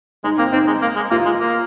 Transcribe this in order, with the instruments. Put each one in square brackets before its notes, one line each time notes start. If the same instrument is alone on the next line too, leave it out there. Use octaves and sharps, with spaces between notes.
[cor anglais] G#3 [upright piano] D#4
[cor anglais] A#3 [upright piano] C4
[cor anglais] C4 [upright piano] D#4
[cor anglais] G#3
A#3
G#3
[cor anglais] A#3 [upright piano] F4
[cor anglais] G#3
A#3